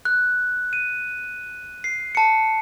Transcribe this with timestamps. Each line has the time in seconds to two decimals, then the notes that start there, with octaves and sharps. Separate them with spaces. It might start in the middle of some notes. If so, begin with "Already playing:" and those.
0.05 F#6
0.73 D#7
1.84 C7
2.15 A5 C#7